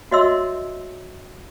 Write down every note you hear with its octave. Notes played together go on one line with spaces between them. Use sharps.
F#4 C#5 D#5 E5 C6 E6